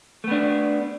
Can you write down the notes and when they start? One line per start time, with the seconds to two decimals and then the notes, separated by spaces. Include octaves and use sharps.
0.24 A3
0.28 B3
0.31 D4